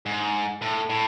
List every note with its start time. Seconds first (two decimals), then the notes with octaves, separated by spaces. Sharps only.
0.06 G#2
0.61 A2
0.90 A2